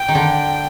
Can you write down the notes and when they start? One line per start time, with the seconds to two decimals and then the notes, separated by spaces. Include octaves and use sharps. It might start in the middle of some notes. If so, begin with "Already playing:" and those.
Already playing: G5
0.08 D#3
0.15 D3